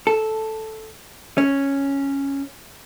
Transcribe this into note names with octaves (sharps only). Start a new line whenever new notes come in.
A4
C#4